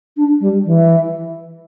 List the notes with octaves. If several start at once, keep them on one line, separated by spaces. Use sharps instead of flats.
D4
G3
E3